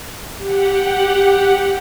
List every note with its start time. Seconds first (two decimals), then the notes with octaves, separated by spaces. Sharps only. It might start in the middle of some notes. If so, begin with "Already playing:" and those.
0.37 G4 F#5